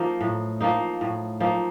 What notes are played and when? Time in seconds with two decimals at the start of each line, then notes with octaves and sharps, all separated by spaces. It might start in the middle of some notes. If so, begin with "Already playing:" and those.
Already playing: F3 A#3 D#4
0.21 A2
0.60 F3 A#3 D#4
1.01 A2
1.40 F3 A#3 D#4